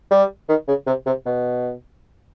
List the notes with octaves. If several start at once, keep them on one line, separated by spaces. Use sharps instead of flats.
G3
D#3
C#3
C3
C3
B2